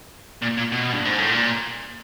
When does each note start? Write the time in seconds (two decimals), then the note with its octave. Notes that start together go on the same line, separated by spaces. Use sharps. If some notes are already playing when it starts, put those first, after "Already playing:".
0.42 A#2
0.57 A#2
0.72 B2
0.92 G2
1.05 G#2
1.18 A2
1.31 A#2